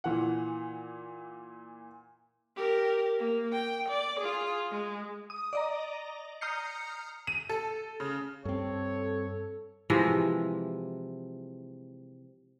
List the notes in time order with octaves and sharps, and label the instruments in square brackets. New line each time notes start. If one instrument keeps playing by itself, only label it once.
[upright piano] A#2 E3 F#5
[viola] G4 A#4
A#3
G5
D5
F4 G#4
G#3
[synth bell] D#6
D5 D#5 A#5
A#5 D#6 F6 G6 C7 C#7
[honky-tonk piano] D#7
A4
C#3
[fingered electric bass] G2 C4 [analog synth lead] A4 [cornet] C#5
[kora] C3 E3 F3 G#3